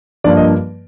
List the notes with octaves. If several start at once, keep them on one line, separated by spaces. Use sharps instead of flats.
G2 F3 A#3 D4 D5
D#5